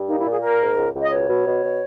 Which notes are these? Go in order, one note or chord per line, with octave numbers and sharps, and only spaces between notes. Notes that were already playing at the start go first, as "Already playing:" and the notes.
Already playing: G2
A#3 D#4
E4
A#2
G#4
A#3 A#4
G#2
C#2
C#2
D#5
B2 C#5
B2
B2
B2